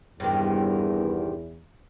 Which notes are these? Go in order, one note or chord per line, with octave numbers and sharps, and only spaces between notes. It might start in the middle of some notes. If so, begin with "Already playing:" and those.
E2 G2 C3 D#3